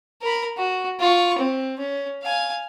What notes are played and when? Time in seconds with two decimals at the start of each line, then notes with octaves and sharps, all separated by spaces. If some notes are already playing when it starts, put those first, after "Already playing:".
0.21 A#4 B5
0.57 F#4
1.00 F4 C#6
1.38 C4
1.79 C#4
2.23 F5 G#5